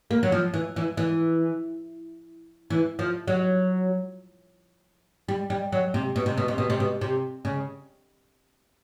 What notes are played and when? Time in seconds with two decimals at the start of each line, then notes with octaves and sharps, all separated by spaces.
0.11 A#3
0.23 F#3
0.32 F3
0.54 E3
0.76 E3
0.97 E3
2.70 E3
2.99 F3
3.28 F#3
5.28 G3
5.50 G3
5.72 F#3
5.94 C3
6.16 B2
6.26 C3
6.37 B2
6.48 C3
6.58 B2
6.70 C3
6.80 B2
7.01 C3
7.45 C#3